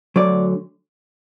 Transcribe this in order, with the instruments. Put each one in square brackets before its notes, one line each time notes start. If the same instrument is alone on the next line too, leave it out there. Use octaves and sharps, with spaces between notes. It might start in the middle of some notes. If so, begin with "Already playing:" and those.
[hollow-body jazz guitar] D2 D3 F#3 D5